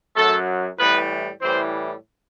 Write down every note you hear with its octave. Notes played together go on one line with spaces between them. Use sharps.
F#2 F#3 A3 A4
A2 E3 G3 B3 B4
A2 E3 G3 C4 C5